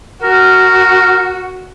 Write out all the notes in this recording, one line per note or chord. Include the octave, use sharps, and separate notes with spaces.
F#4 A#4